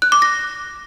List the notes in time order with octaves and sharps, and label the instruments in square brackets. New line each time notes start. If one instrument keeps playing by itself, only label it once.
[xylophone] F#6
D6
A#6